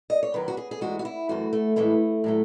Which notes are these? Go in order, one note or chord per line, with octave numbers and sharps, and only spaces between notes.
D#5
C#5
F#2 D#3 F#3 B4
F#4
G#4
G#4
G#2 E3 G#3 F#4
F#4
E4
F#2 E3 A3 F#4
A3
A2 E3 G#3 A3
A2 F#3 A3